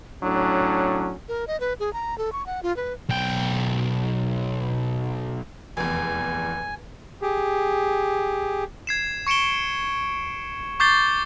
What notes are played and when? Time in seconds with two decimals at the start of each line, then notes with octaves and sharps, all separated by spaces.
0.22 A2 F#3 C#4 D4
1.29 A#4
1.48 D#5
1.60 B4
1.80 G#4
1.93 A#5
2.18 A4
2.32 C#6
2.46 F#5
2.63 F4
2.76 B4
3.09 B1 G5
5.77 F1 E2 G#5
7.22 G4 G#4
8.87 G#6 C7 E7
9.27 C#6 C#7 D7 E7 G7
10.80 C#6 D6 G6 A6 C7 G7